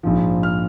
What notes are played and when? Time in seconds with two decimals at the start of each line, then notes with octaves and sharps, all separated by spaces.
0.03 A#1 G#2 F3
0.43 F6